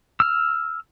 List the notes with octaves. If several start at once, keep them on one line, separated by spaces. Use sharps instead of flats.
E6 F6